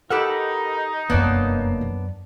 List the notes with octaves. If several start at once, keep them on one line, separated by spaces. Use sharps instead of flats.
D#4 G4 A4 A#4 F#5 B5
F1 F#2 A#3 B3 D4 C#5
F#2